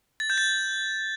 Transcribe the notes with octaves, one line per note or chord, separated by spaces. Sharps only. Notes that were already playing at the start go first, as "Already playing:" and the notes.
A6
G6
A6